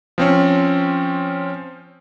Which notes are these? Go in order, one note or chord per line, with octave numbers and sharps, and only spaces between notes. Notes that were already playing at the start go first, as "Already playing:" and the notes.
F3 C4 C#4